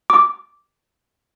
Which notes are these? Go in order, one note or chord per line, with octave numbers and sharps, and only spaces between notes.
D6